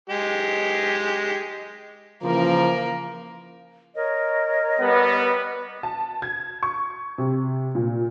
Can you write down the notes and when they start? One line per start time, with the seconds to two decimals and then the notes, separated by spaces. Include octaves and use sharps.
0.10 G#3 G4
2.22 C#3 E3 F3 A#3 A#4
3.95 A#4 C#5 D#5
4.80 G3 B3
5.83 A5
6.22 G#6
6.63 C#6
7.18 C3
7.75 A#2